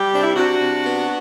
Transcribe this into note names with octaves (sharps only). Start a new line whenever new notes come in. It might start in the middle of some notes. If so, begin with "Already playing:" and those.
Already playing: G3 G4
C3 D4
E4
C3 D4 F#4
C3
B3